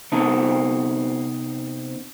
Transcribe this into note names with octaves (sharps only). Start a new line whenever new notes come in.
C3 B3 C4 D#4 A5